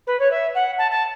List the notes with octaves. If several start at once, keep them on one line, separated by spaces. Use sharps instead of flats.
B4
C#5
E5
F#5
A5
A5